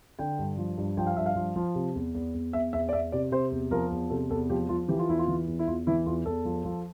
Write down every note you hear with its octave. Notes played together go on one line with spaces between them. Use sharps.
D3 G5
G2
F3
G2
F3 G5
F5
G2 E5
F5
F3
F3
C3
E2
E2
E2
E2 E5
E2 E5
D5
E2 E5
C3 D5
C3 C5
E2
F3 A#4
E2
C3 A4
E2 A4
F3 G4
F3 F4
E3 G4
F4
E2 E4
F4
E3
E2
E4
E2 F4
E3 E4
E2 F4
E2 A4
F3
F3